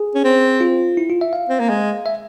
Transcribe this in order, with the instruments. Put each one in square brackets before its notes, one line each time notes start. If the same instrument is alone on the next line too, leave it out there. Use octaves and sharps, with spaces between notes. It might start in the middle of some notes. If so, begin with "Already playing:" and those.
Already playing: [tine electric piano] G#4
[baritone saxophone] C#4
C4
[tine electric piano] F4
E4
F4
E5
F5
[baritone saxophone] C4
A#3
G#3
[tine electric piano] E5